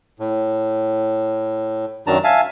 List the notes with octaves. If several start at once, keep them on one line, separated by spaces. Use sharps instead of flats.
A2
F#2 D#3 F#3 D4 A5 A#5
E5 F5 G#5 A5